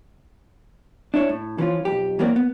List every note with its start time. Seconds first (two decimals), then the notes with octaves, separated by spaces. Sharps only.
1.14 D4 E4 C#5
1.29 A2
1.58 E3 F3 C#4 F4
1.85 B1 F2 G4
2.19 E3 F#3 A#3 C4 F#4 D5
2.36 B3